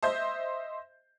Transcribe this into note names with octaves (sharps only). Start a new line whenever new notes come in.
C5 D#5 E5 G6